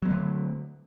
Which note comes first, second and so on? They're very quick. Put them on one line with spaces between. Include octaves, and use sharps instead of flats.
F#3 A#3 A3 D3